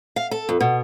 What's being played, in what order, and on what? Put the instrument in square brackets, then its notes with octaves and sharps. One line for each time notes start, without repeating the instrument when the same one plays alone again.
[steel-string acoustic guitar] F5
A4
F2
B2